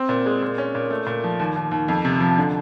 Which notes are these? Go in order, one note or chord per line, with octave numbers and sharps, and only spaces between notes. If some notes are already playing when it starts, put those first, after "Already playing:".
Already playing: C4
A#2
G#3
A#2
C#4
A#2
A3
A#2
F3
D#2
D#2
D#2
F2
C3
F3
D3